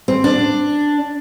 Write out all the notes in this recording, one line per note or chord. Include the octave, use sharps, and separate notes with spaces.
C4
D4